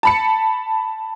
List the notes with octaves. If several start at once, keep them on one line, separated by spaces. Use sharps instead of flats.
A5 B5 C#7